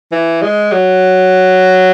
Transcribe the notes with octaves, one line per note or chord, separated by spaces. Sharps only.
E3
G#3
F#3